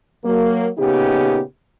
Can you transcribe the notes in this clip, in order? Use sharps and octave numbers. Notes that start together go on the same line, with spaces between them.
F#3 A#3
A#2 C#3 B3 D#4 G4